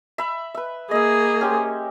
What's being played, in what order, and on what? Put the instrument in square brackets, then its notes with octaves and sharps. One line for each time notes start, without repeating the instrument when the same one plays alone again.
[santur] E5 B5
B4 E5
[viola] A#3 G#4 [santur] D#5 E5
[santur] C#4 G4 C5